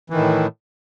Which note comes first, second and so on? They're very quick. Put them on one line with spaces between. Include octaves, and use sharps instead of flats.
E3 D#3 A2